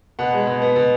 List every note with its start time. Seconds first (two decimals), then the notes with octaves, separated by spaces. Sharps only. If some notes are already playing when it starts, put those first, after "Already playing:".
0.19 B2 F#5
0.33 G#3
0.47 B2
0.62 B3
0.76 B2